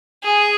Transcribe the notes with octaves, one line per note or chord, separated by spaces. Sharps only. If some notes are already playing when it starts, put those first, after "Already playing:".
G#4